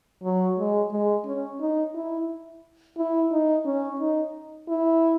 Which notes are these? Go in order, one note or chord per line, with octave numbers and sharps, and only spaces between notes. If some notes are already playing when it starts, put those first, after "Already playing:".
F#3
G#3
G#3
C#4
D#4
E4
E4
D#4
C#4
D#4
E4